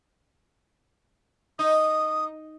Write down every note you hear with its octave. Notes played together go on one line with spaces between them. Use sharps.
D#4 D#6